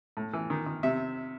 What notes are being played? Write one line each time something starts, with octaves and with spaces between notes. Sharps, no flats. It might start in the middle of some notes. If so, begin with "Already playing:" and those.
A2
E3
D#3
D#3
C3 E5